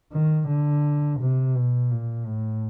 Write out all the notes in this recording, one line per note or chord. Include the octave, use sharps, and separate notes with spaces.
D#3
D3
C3
B2
A#2
A2